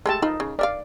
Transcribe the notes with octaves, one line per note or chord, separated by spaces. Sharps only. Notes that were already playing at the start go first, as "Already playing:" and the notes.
G#3 A3 G4 A4 A5
F3 D#4 B5
C#3
A#4 D5 E5 F5